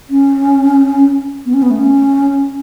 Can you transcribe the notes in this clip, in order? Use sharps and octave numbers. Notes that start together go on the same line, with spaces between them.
C#4
B3
C#4
B3
A3
C#4